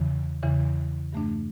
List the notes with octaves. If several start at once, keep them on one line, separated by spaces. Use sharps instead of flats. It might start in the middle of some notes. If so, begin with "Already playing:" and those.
Already playing: E2 C#3 E3
E2 C#3 E3
G2 E3 A3 D4